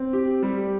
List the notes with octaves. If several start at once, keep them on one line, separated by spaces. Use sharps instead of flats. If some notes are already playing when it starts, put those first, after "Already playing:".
Already playing: C4
G4
G3